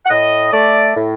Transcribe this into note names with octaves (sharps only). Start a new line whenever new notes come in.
F#5
A2 D#5
A3 D5
A2